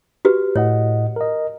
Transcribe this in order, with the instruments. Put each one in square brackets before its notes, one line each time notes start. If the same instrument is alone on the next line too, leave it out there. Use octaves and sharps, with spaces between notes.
[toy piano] F#4 G4 B4
[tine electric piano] A2 D#5 F#5 [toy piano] C#5
[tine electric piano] A#4 D#5